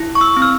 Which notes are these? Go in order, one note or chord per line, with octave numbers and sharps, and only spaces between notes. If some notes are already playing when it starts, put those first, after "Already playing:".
Already playing: E4
C#6
E6
C4
F6